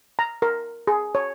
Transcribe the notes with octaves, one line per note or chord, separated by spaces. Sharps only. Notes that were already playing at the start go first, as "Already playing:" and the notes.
A#5
A#4
G#4
C#5